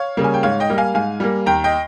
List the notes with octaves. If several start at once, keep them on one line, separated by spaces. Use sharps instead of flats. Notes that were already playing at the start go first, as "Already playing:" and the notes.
Already playing: C#5 F5
C#3 G3 A#3
G#5
G5
G#2 C#5 F5
D#5 G5
G3 A#3
F5 G#5
G#2 F5 G#5
G3 A#3
D#2 G5 A#5
D#5 G5